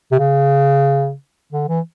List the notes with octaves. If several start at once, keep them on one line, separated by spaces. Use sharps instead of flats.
C3
C#3
D3
E3